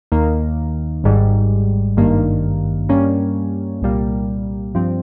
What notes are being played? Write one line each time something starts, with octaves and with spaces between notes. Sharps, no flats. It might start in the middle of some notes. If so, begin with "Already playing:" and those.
D#2 D#3 A#3
G#1 G#2 G3
G#1 G2 D#3 A#3
G2 G3 A#3 C#4
C2 A#2 G3 A#3
G2 F3 C4